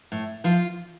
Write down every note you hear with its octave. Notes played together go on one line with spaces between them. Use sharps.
A2
F3 F4